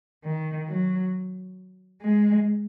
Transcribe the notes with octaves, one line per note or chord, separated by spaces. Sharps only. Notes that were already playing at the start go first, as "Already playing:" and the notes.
D#3
F#3
G#3